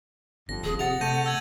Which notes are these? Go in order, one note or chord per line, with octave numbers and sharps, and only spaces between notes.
G1 F2 A#6
D#1 G#4
C3 F#5 A6 F7
C3 A3 G6 A#6 D#7
E6 G#6 F#7